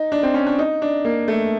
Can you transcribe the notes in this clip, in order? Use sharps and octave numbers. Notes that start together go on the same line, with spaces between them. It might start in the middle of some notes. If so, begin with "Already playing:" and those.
Already playing: D#4
D4
C4
C#4
D4
D#4
D4
A#3
A3